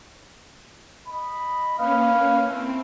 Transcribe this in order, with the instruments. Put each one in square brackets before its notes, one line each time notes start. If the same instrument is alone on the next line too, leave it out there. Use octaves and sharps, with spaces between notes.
[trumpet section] D#5 B5
[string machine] A#3 C#4 [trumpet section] B4 F5
[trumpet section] A3 E4 [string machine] C4